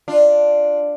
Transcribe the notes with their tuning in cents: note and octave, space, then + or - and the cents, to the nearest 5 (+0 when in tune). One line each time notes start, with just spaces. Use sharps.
D4 +0 F4 +0